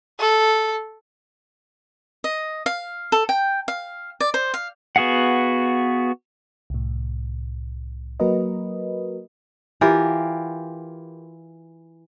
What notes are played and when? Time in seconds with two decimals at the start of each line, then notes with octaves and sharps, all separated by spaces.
0.19 A4
2.24 D#5
2.66 F5
3.12 A4
3.29 G5
3.68 F5
4.20 D5
4.34 C5
4.54 F5
4.96 B3 F#4 G#4 F5 F#5
6.70 C2 A2
8.20 F#3 A#3 F#4 A#4 B4 D#5
9.81 E3 F4 G4 A#4